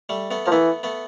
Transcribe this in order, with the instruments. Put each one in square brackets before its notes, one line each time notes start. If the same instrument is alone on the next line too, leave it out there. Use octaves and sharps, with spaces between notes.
[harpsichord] G3 A3
A3 B3
[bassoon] F3 [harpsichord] A#3
[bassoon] E3 [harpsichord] A3 B3
[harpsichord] A3 B3